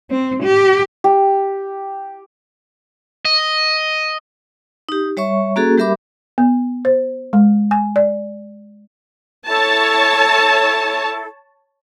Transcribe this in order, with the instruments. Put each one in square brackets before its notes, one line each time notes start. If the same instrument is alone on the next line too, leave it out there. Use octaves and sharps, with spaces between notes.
[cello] C4
G4
[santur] G4
[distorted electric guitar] D#5
[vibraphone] D#4 G4
G3 C#5 E5 C#6
A#3 C#4 F#4 G#4 A4
G3 G4 A#4 E5 B5 D6
[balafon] B3
C5
G#3
G#5
D5
[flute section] E4 A4 [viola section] C#5 A5